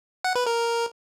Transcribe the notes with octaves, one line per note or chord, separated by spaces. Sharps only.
F#5
B4
A#4